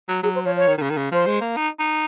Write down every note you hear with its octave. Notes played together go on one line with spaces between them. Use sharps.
F#3
F#3 G#4
C5
F3 C#5
C#5
D#3
D#3
C#3
D#3
C#3
F3 C5
G#3
A#3
D#4
D#4